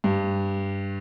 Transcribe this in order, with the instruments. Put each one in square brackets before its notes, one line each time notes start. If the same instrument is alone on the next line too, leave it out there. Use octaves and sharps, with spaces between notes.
[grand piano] G2